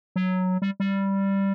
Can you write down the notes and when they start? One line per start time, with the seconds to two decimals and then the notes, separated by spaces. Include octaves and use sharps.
0.16 F#3
0.62 G3
0.80 G3